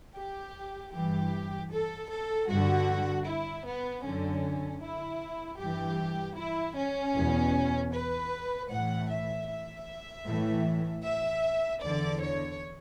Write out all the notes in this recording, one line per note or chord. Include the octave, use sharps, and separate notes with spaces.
G4
G2 E3 G4
A4
A4
G2 D3 F#4
E4
B3
F#2 D3 C#4
E4
G2 E3 G4
E4
C#4
E2 B2
B4
A2 E3 F#5
E5
E5
A2 E3
E5
E2 D3 D5
C#5